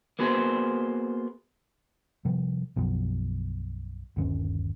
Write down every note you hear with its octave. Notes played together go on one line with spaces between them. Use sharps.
A#3 B3 F#4 G#4 C5
C3 F3 G3
B1 F#2 B2 F3
G1 D#2 C4 C#4